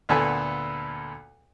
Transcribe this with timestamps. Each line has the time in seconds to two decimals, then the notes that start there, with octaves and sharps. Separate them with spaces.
0.09 D2 A#2 B3 A4 B4 G#5